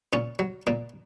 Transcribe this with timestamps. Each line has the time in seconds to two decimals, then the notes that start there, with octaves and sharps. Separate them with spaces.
0.13 A#2 C#4
0.39 F#3
0.67 A#2 A#3